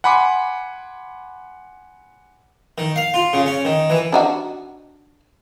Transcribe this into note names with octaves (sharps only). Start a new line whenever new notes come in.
F#5 G#5 B5 C6 D6
D#3
F5
F4
C#3
C#4
D#3
E3
D4 D#4 F#4